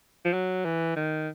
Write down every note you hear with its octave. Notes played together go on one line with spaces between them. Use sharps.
F3
F#3
E3
D#3